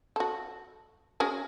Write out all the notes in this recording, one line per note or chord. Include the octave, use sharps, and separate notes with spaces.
F#4 A4
C#4 F#4 G#4